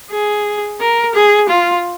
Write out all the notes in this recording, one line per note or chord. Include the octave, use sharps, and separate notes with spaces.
G#4
A#4
G#4
F4